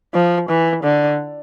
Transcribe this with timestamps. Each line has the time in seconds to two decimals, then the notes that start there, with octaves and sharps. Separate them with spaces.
0.14 F3
0.49 E3
0.84 D3